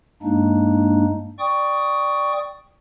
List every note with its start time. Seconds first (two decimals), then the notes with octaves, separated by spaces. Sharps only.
0.23 G2 G#3 A#3 D4 D#4
1.39 D5 G5 C#6 D#6